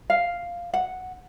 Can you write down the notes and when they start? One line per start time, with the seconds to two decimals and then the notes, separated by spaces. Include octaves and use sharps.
0.10 F5
0.74 F#5